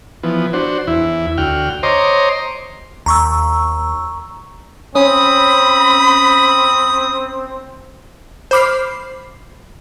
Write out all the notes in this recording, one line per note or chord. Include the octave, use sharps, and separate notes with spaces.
E3 F3 B3
D4 F#4 C5
E2 E4
D2 F#4 G5 F6
C5 C#5 D#5 A#5 C6 D6
D#2 A#5 C#6 E6
C4 C#4 B5 D#6
C5 B5 D6 F6 C7